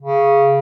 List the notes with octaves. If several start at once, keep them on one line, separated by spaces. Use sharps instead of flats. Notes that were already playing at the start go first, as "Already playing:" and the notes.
C#3